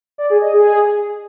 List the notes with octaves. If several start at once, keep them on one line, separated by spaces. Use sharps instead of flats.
D5
G#4
D#5
G#4